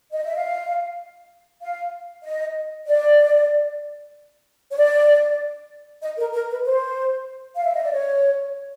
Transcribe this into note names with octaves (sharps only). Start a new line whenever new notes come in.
D#5
E5
F5
F5
D#5
D5
C#5
D5
D#5
A#4
A#4
B4
C5
F5
E5
D#5
D5
C#5